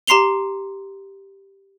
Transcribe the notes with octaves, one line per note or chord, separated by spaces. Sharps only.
G4 A#5 C6 C7 F7 G7